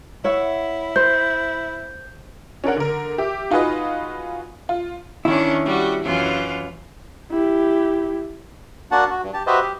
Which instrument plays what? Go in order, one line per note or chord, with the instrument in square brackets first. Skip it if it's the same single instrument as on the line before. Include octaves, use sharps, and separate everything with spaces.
[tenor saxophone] E4 [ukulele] C#5 E5 F#5
[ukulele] C5 [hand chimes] G6
[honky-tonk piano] C#4 D4 A#4 F#5
D3 A#4
G4 E5
D#4 F4 F#4 G#4 B4 D#5
F4
[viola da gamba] D#3 C#4 D4 [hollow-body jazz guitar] E4
[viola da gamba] G3 F#4
F#2 E3 F4
[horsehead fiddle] E4 G4
[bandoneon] A#3 D4 F#4 F#5 A5
F#4
G2
G4 A5
F#4 G4 B4 C5 D#5 E5
G4